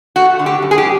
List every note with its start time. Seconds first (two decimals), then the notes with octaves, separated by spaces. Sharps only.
0.16 A3 F#4
0.39 D3
0.46 G4
0.62 F#2
0.71 G#4
0.78 G4